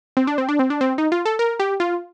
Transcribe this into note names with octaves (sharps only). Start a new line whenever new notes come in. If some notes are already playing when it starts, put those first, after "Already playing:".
C4
D4
C4
D4
C4
D4
C4
D#4
F4
A4
A#4
G4
F4